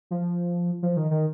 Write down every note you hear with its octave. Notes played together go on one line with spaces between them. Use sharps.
F3
F3
D#3
D#3